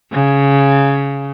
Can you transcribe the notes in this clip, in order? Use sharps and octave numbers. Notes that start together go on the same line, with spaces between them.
C#3